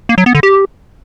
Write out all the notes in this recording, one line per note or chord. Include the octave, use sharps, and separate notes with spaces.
A#3
F#3
B3
D3
G4